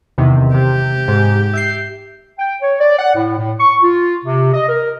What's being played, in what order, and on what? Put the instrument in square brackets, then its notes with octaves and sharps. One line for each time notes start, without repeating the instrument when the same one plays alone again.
[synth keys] E2 C3 D#3
[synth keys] C3 [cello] G4
[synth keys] G#2
E5 G6 C7
[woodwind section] G5
C#5
D5
F#5
A2
A2
C#6
F4
C3
D#5
A#4